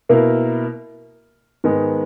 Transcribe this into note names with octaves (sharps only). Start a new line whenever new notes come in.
B2 A#3 E4 A#4
G#2 D#3 G#3 B3